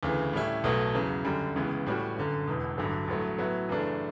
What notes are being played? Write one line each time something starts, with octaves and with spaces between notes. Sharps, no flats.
D2 C#3 E3
A2 G3 C#4 E4
B1 B2 F#3 A3
E2 C#3 F#3
F#2 D3 G3
C#2 C#3 E3 B3
A2 G3 C#4 F#4
G1 F#2 D3
E1 E2 B2
A1 G2 D3 F#3
A1 G2 F#3 A3
A2 F#3 B3 E4
F#2 C#3 E3 A3 D4